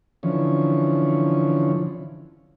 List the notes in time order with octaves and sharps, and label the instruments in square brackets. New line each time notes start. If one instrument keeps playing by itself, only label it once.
[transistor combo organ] D3 E3 F3 C#4